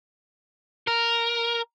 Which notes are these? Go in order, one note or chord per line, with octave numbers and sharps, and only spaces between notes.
A#4